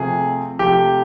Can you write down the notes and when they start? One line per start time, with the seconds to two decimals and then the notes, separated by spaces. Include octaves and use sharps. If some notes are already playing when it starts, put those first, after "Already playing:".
Already playing: C3 F3 A3 G#4
0.59 C3 F3 A3 G4